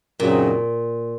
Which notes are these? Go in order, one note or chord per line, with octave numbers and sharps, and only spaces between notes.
F#2 A#2 C#3 F#3 C4 D#4